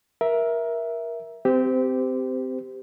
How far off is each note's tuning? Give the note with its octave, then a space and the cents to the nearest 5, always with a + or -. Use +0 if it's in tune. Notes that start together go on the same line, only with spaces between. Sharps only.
A#4 +20 E5 +0
C4 -20 G4 +0 C5 -30